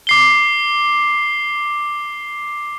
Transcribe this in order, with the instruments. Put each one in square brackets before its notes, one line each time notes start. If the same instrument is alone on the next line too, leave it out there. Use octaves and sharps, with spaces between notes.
[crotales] D6 C7 G7